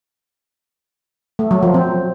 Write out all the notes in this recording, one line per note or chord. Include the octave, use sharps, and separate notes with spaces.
A3
F#3
F3
C4